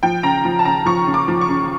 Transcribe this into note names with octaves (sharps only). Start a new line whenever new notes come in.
F3 G5
C#3 A#5
F3
A5
C#3 A#5
F3 C#6
C#3
D6
F3
C#6
C#3